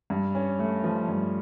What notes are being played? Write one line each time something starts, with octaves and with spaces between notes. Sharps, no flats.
G2
C#4
A3
F3
G2